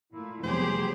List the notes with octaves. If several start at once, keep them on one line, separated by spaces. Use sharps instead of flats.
A#2 A3 E4
F1 E3 F#3 G3 B3 G4 G#4 C5